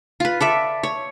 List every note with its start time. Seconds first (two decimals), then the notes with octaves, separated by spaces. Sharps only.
0.20 F4 B4
0.40 A4 D5 E5
0.83 C#5